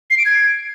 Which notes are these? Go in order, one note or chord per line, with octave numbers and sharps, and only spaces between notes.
C7
D7
G#6